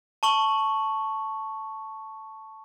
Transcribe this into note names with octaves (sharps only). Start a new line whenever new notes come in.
A5 C#6 F#7